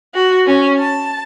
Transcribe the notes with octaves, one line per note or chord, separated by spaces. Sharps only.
F#4
C#4
A5